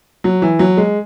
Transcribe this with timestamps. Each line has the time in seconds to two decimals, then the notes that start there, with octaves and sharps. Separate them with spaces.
0.24 F#3
0.42 E3
0.59 F#3
0.77 G#3